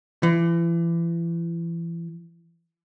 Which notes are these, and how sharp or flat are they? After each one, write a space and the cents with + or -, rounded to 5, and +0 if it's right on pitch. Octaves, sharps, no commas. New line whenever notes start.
E3 +35